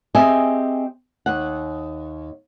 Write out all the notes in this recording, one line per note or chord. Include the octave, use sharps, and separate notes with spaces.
C4 G4 G#4 D#5 E5 G#5
D#2 F#5